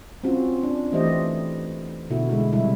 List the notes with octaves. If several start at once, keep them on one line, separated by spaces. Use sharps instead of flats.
C4 C#4 F4 F#4
D4
E3 A3 E4 G4 C5 D#5
B2 D3 E4 F#4
G#3 E4
C3 G3 E4